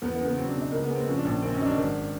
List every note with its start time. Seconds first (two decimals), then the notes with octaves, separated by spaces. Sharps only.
0.02 E2 B3
0.14 B3
0.19 C#3
0.25 B3
0.37 F#3 C4
0.48 D4
0.55 B2
0.61 D#4
0.72 C#2 A#3
0.84 B3
0.90 G#3
0.95 C4
1.08 F3 C#4
1.18 D4
1.25 A#1 C#4
1.42 D#3 C4
1.54 C#4
1.60 F#3 D#4
1.65 D4
1.77 G#1